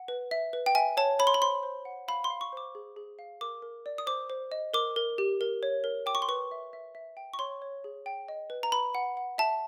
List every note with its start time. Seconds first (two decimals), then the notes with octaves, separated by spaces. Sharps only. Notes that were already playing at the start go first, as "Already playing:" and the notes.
Already playing: F#5
0.08 B4
0.31 E5
0.53 B4
0.66 G5
0.75 E5 G#5
0.97 C#5 A5
1.19 C#5 B5
1.27 C6
1.34 B5
1.42 C5 C6
1.63 C5
1.85 F#5
2.08 F5 B5
2.24 C6
2.30 F5
2.41 C#6
2.53 C5 D6
2.75 G#4
2.96 G#4
3.19 F5
3.41 A#4 D6
3.62 A#4
3.86 D5
3.98 D#6
4.07 C5 D6
4.30 C5
4.52 D#5
4.74 A#4 D6
4.96 A#4
5.18 G4
5.41 A#4
5.63 C#5
5.84 A#4
6.06 G5 D6
6.15 C#6
6.22 C6
6.28 B4 C#6
6.51 E5
6.73 E5
6.95 E5
7.17 G5
7.34 C#6
7.39 C#5 C6
7.62 C#5
7.84 G#4
8.06 G5
8.28 D#5
8.50 B4
8.63 A#5
8.72 B4 B5
8.95 F#5
9.17 F#5
9.38 E5 A5